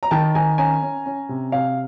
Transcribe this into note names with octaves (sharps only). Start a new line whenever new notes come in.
A#5
D#3 G5 A5
D#3 G#5 A#5
C#4 G#5 A#5
C#4
C#4
C3
C3 F5